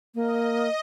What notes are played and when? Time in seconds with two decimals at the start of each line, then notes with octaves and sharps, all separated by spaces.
0.15 A#3 D#5